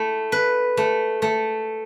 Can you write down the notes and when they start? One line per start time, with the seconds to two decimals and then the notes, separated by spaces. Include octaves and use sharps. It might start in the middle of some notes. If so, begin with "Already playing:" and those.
Already playing: A3 E4
0.32 B4
0.77 A3
1.22 A3